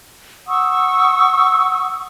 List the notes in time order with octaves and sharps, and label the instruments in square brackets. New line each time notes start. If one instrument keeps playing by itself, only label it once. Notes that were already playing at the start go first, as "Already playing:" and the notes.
[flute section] F#5 C#6 D#6 E6